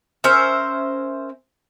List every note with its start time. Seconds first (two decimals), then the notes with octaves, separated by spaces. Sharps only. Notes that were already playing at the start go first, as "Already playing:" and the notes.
0.24 C#4 A#4 C5 E5